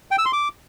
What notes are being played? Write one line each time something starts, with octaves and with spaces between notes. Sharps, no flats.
G5
E6
C6
D6